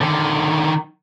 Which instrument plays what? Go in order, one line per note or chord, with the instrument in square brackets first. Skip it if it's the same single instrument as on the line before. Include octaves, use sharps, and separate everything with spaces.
[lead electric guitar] D3 D#3